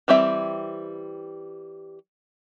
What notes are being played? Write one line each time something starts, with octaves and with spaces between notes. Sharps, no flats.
E3 G3 C4 E5